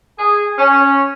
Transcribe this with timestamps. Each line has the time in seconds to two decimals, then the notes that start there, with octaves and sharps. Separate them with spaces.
0.19 G#4
0.58 C#4